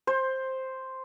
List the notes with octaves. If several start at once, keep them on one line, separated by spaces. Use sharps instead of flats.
C5